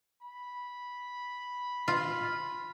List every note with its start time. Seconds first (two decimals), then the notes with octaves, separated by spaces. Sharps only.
0.22 B5
1.88 F4 F5